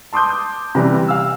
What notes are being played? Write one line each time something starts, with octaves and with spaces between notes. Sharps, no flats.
A5 C6 D6 D#6 G6
C3 E3 G3
F5 E6